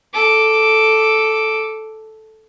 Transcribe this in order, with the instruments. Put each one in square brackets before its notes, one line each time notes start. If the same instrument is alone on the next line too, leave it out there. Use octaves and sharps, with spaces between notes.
[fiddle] A4 D6